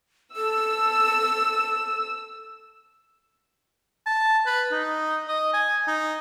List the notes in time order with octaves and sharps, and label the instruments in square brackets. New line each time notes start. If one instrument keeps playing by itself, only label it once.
[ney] A4 [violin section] E6
[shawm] A5
B4
D#4
D#5
G#5
D#4